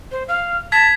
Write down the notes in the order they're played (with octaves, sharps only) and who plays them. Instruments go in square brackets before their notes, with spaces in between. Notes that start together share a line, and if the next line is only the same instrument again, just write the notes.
[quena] C5
F5
[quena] A5 [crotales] G#6 B6